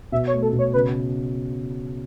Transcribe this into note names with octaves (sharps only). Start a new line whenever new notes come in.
B2 E5
C#5
A3
A4
B2
C#5
C#3 B4